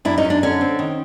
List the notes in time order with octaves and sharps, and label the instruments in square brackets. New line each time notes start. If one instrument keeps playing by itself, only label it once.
[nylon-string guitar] F#2 D4 E4
C#4 D#4
F#2
D4
D3 C#4
C4
D#3